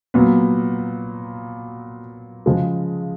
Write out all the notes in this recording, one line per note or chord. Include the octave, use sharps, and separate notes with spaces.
A#2 F#3 B3
C#3 F3 G#3